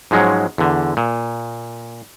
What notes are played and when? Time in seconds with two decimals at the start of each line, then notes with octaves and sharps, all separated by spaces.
0.11 G#2 F3 F#3 G#3 C#4
0.58 E2 D3
0.97 A#2